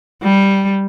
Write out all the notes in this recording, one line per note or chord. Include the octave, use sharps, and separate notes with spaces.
G3